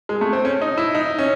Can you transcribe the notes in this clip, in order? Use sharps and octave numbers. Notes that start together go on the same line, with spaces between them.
G#3
A3
C4
C#4
D#4
E4
D#4
C#4